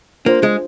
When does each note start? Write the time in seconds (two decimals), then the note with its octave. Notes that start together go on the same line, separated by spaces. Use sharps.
0.25 A#3 D4 F4 C5
0.43 G#3